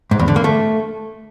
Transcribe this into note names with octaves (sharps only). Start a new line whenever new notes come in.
G#2
E2
D3
A#3
A3